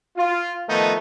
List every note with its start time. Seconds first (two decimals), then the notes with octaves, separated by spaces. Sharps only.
0.16 F4
0.68 D#3 F3 A3 B3 D#4